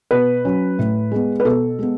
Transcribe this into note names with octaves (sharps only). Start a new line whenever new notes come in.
B2 B4
F#3 C#4
A2
G#3 B3
B4
B2 A4
G#3 B3